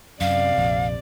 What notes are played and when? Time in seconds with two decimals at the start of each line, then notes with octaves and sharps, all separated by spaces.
0.21 F#2 C3 D5 F5
0.57 A#1 F2